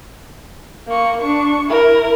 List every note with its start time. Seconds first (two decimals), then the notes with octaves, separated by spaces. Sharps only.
0.87 A#3 C#6
1.22 D4 C#6
1.68 E4 A#4